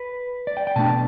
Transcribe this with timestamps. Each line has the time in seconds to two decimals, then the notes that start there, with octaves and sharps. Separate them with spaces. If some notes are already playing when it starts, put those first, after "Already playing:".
Already playing: B4
0.47 D5
0.57 G5
0.67 G5
0.76 B2 A3 D4 A5